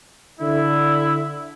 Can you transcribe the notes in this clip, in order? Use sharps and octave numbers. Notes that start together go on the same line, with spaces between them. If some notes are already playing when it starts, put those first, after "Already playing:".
D3 E4